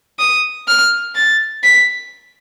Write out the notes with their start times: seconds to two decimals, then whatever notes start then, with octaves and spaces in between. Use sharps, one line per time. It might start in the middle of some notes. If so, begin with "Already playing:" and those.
0.19 D#6
0.68 F6
1.15 A6
1.64 B6